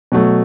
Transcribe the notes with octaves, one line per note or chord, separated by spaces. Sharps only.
B2 F#3 A3